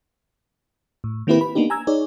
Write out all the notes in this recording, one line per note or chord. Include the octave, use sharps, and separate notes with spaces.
A2
D#3 A#3 C4 E4 G4 B4
B5
A#3 B3 D4 D#4 G4
G#5 A#5 E6 G#6
D#4 G#4 C#5 D5